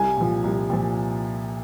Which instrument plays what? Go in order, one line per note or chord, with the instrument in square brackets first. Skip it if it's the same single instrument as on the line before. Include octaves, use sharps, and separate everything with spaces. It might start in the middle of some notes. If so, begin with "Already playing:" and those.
Already playing: [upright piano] C2 G#5
A#2 F3
C2
A#2 F3